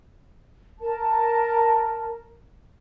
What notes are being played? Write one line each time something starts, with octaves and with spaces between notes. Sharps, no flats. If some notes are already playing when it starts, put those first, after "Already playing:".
A#4 A5